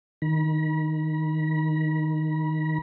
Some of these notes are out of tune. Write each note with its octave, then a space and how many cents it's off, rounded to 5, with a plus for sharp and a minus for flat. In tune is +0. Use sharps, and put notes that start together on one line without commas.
D#3 +0 B5 -45